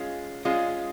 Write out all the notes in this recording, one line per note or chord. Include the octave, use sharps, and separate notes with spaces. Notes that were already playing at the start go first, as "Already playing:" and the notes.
Already playing: G#3 C#4 F4
G#3 C#4 F4